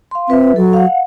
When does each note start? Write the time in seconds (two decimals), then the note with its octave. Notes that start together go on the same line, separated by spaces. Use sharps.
0.11 F5 C6
0.29 C4 F4 B4 E5
0.56 F#3 A4
0.73 F5 F#5